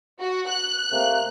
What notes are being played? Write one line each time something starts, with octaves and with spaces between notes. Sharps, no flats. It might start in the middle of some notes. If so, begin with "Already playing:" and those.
F#4
F#6
C3 A3 A#3